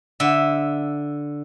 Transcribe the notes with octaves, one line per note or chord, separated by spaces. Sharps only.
D3 E5